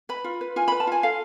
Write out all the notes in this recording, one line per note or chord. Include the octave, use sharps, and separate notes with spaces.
B4 B5
F4
B4
F4 G#5
B5
B4
A5
F4 G#5
A4 F5